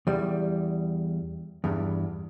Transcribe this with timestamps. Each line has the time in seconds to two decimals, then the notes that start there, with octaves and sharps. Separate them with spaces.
0.07 E2 G3
1.64 E2 G2